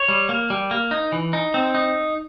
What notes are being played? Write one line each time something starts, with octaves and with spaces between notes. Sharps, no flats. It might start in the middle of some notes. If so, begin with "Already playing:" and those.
Already playing: C#5
G3
A#3
G3
A#3
D#4
E3
D#4
C4
D#4